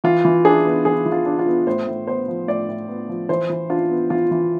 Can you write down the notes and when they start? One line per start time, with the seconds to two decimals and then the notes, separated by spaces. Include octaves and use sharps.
0.04 E3 F4
0.25 E3
0.45 D4 G#4
0.65 B3
0.85 E3 G#4
1.06 E3
1.12 F4
1.26 D4
1.39 F4
1.46 B3
1.67 A2 C5
1.87 A2
2.07 B3 C5
2.28 F3
2.47 A2 D5
2.69 A2
2.89 B3
3.09 F3
3.29 E3 C5
3.49 E3
3.70 D4 F4
3.90 B3
4.10 E3 F4
4.31 E3